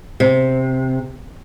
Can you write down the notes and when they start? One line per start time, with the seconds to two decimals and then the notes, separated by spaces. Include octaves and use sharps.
0.20 C3